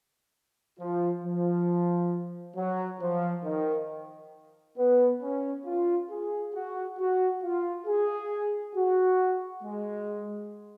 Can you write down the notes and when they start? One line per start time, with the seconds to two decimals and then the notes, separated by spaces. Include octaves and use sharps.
0.80 F3
1.24 F3
2.57 F#3
3.01 F3
3.44 D#3
4.78 B3
5.22 C#4
5.66 F4
6.10 G#4
6.54 F#4
6.99 F#4
7.43 F4
7.87 G#4
8.76 F#4
9.63 G#3